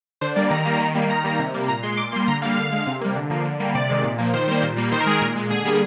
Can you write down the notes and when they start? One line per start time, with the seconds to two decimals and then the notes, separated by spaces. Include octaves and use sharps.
0.21 D3 C5
0.36 G3 A#3 D5
0.50 D#3 A#5
0.65 G3 A#3
0.80 D#3
0.95 G3 A#3
1.10 D#3 A#5
1.24 G3 A#3
1.39 C3
1.54 G3 A#3
1.68 A#2 A#5
1.83 G#3 C6
1.97 A#2 D6
2.12 G3 A#3 C6
2.28 D3 A#5
2.42 A#3 F5
2.45 G3
2.56 D3 F5
2.72 G#3
2.87 C3
3.01 G3 A#3
3.16 D3
3.30 F3 A#3
3.45 D3
3.60 G3 A#3
3.75 C3 D5
3.89 D#3 G#3
4.04 A#2
4.18 F3 A#3
4.33 D#3 C5
4.48 G3 A#3
4.63 A#2
4.77 G3 A#3
4.92 D#3 C5
5.00 A#4
5.06 G#3 G#4
5.15 A#4
5.21 A#2
5.36 G#3
5.50 D3 G#4
5.65 G3 A#3